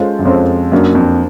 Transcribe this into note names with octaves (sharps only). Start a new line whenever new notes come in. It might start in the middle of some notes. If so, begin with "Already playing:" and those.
Already playing: G#3 C#4 F4 A4 C5
F#2
F2 G#3 C#4 F4 A4 C5
F#2 F#3 A#3 D4
F2